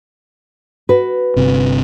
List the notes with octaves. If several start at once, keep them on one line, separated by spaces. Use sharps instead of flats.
F#4 B4
G1 C3